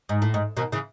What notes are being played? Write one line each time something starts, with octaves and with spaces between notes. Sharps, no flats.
G#2
A2
G#2
B2 D#3
C#3 E3